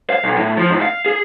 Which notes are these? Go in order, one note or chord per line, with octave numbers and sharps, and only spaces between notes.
F5
B1
A2
F3
G#2
F5
G#4